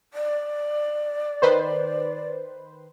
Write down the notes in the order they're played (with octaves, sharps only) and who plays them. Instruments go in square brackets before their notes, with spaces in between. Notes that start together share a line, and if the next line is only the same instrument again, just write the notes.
[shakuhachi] D5
[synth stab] D#3 B4 C5